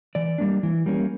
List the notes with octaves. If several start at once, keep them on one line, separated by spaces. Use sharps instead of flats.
E3 D5
G3 A#3 D4
E3
G3 A#3 C#4